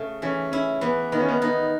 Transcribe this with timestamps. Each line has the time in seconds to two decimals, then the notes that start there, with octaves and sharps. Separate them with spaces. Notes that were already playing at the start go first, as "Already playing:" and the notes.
Already playing: C#3 A3
0.22 E3 C#4
0.52 C#4 E4
0.81 E3 B3
1.12 D#3 B3
1.20 C#4
1.29 B3
1.41 B3 D#4